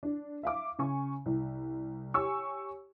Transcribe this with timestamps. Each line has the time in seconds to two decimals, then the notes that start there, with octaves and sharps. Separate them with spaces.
0.03 D4
0.43 E5 F5 D6
0.79 C#3 G#5 C#6
1.26 C2
2.14 G4 C#5 G#5 C#6 E6